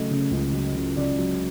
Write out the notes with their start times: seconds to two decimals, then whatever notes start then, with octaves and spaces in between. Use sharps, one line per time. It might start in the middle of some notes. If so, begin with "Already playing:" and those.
Already playing: C#3 F#3 A3 D#5
0.11 C#3
0.31 C#2
0.53 F#3
0.75 C#3
0.96 C#3 D5
1.18 F#3